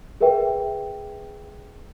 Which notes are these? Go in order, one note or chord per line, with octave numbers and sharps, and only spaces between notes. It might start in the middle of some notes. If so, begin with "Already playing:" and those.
G#4 A#4 B4 E5 G5